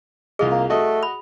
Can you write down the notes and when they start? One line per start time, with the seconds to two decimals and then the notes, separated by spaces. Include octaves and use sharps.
0.39 C2 F4 G#4 D#5
0.51 A#3
0.70 A3 F#4 D#5
1.03 B5